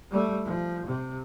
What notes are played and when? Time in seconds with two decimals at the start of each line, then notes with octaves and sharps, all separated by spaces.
0.11 G3 A3
0.45 F3
0.86 C3